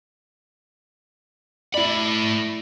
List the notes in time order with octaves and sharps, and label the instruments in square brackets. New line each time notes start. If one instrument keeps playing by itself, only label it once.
[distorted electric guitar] A3 B5 [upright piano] E4 D5